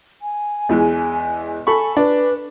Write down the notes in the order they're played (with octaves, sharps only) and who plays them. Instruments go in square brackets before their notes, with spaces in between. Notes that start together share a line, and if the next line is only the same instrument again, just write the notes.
[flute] G#5
[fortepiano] E2 E3 G#3
[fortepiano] A4 B5 C#6 [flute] G#5
[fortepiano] D4 [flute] B4